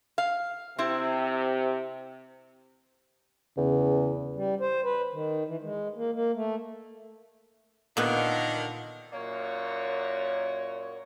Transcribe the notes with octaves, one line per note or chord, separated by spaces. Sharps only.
F5
C3 C4 E4
E2 C#3
G3
C5
B4
D#3
E3
G#3
A#3
A#3
A3
A#2 D3 D#3 B3 A#4
F#2 A#2 A#3 C#5